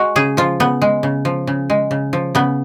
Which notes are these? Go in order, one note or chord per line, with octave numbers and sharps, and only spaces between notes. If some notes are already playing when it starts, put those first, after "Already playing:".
Already playing: G#3 F#4
C#3 G#4
F3 F4
C#3 B3
G#3
C#3
F3
C#3
G#3
C#3
F3
C#3 B3